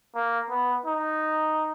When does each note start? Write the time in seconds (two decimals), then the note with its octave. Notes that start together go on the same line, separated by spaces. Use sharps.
0.15 A#3
0.50 B3
0.85 D#4